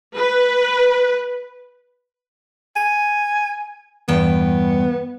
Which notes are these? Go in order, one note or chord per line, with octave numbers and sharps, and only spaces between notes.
B4
G#5
E2 G2 B3 G5